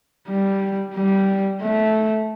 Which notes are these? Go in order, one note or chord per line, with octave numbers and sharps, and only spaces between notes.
G3
G3
A3